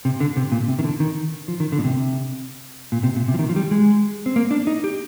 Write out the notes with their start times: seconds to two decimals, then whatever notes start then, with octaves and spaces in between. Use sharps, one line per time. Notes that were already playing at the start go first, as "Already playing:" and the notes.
0.05 C3
0.20 D3
0.37 C3
0.52 A#2
0.68 C3
0.79 D#3
0.84 D3
1.00 D#3
1.48 F3
1.60 D#3
1.72 D3
1.78 A#2
1.84 C3
2.92 A#2
3.03 C3
3.16 A#2
3.28 C3
3.34 F3
3.39 D#3
3.49 F3
3.56 G3
3.71 G#3
4.26 C4
4.36 A#3
4.51 D4
4.67 D#4
4.84 G4